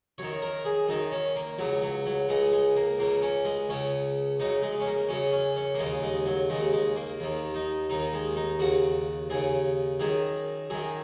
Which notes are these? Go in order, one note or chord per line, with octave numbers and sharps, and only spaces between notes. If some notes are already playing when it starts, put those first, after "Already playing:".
F#2 D#3 C#5
A#4
G#4
F#2 D#3 D#4
C#4
A#3
C#2 C#3 F#3
F#3
F#3
C#2 C#3 G#3
G#3
A#3
C#2 C#3 A#3
C#4
G#3
C#2 C#3 C#4
F#2 C#3 D#4
G#3
C#4
A#3
F#2 C#3 C#4
C#4
C#4
A#3
D#2 C#3 G#3
G#3
F#3
D#2 C#3 G#3
G#3
A#3
D#2 D#3
D#4
D#2 D#3 D#4
G#3
D#4
D#2 C#3 F#4
D#2 C#3 G#4
F#2 D#3 G#4
F#2 D#3 G#4